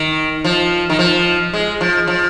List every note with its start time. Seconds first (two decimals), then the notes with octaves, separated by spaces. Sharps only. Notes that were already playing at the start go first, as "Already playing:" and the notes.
Already playing: D#3
0.45 F3
0.90 D#3
0.99 F3
1.53 G#3
1.81 F3
2.07 F3